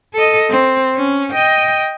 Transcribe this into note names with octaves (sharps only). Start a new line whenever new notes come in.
A4 D#5
C4
C#4
D#5 G5